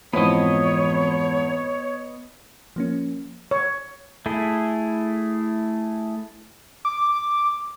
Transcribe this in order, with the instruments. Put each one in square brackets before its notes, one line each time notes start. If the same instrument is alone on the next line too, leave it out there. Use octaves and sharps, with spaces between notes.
[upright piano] F2 G#2 B5 [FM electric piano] E3 C4 [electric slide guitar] B3 D#5 [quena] C#5
[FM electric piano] F3 A#3 C#4
[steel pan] C#5
[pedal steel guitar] A3 E4 G#4
[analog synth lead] D6